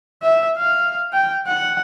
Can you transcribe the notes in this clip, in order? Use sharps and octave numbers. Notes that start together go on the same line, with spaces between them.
E5
F5
G5
F#5